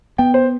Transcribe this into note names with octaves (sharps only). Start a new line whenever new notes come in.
B3 G5
C5